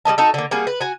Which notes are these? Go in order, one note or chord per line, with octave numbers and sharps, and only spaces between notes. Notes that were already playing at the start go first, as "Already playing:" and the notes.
G3 A#3 D#5 A5
D#4 F#4 A4
D3 A#3
G3 A#3 F#4 G#4
B4
F#4 G#5